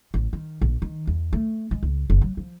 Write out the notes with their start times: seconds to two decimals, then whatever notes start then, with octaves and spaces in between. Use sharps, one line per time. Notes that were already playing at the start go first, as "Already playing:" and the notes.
0.14 A1
0.33 D#3
0.62 A#1
0.82 D#3
1.07 E2
1.33 A3
1.71 G#3
1.83 C#2
2.10 F#1
2.22 F#3
2.37 F3